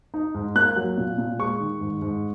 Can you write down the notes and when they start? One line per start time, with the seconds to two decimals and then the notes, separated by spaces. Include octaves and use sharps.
0.14 D#4
0.35 G#2
0.55 A#3 F#6
0.76 F#3
0.97 A#2
1.18 A#2
1.39 G#3 C#6
1.60 D#3
1.81 G#2
2.02 G#2